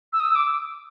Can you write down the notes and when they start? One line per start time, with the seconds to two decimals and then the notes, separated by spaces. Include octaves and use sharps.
0.13 E6
0.20 D#6
0.28 E6
0.35 D6